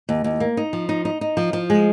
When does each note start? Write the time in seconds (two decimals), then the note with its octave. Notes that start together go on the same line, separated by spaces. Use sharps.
0.09 D#2
0.24 D#2
0.40 A#3
0.57 D#4
0.73 F3
0.89 D#4
1.05 D#4
1.21 D#4
1.37 F3
1.53 F3
1.70 G#3